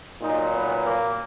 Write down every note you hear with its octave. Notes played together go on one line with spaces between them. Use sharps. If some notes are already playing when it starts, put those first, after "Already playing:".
A#2 F#3 D#4
B3
A#3